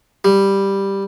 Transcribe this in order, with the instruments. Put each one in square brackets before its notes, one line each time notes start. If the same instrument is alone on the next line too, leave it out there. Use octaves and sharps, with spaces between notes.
[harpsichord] G3